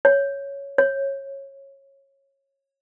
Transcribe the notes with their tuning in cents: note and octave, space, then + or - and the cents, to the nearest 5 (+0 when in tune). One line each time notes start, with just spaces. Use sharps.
C#5 +5
C#5 -15